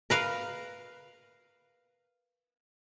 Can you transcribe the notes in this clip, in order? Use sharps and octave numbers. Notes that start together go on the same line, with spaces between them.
A#4 B4 F5